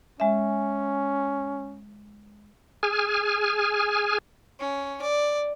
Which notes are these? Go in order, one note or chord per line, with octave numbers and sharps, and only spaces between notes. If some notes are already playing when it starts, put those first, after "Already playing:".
G#3 C#4 E5
G#4 G#5 F6
C#4
D5